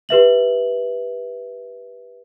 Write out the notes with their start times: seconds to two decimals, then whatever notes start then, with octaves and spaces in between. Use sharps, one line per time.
0.09 G4 B4 E5 F#7